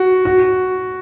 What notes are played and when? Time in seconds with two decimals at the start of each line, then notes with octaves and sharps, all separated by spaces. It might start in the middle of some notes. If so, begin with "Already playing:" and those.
Already playing: F#4
0.25 F#4